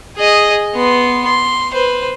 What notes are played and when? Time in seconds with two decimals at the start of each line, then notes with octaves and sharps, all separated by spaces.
0.17 G#4 D#5
0.75 B3 C6
1.25 C6
1.73 B4 C5